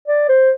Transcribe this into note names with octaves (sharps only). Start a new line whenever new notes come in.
D5
C5